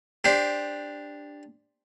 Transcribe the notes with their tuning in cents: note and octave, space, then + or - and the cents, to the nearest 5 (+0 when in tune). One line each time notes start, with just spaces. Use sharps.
D4 +0 G4 +15 C5 +0